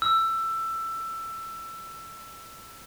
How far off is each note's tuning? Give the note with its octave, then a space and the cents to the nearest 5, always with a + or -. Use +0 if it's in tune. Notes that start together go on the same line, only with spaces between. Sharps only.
E6 +15